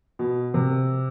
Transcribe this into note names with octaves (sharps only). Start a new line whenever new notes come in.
B2
C3